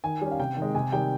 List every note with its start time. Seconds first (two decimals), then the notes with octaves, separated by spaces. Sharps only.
0.04 D#3 G#5
0.22 G3 C#4
0.31 F5
0.39 C3 G5
0.56 D#3
0.62 G#3
0.75 C3 G#5
0.92 D#3 G3 G5